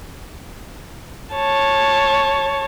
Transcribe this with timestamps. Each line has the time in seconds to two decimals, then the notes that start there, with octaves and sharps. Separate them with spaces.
1.34 C#5 A5